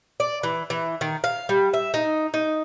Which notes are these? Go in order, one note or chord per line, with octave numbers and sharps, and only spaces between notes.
D5
E3
E3
D#3
F5
G3
E5
D#4
D#4